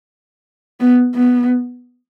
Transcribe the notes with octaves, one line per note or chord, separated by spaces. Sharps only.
B3
B3